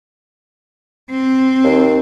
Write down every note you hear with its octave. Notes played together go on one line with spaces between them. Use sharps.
C4
D#2